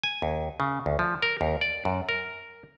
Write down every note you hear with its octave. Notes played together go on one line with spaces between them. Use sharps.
G#5
D#2
C#3
D2
F3
A#4
D#2
D5
F#2
A#4